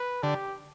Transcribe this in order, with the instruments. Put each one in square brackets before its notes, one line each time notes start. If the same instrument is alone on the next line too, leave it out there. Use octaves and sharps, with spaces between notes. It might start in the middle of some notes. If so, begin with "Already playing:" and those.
Already playing: [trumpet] B4
[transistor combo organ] D3 [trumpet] G4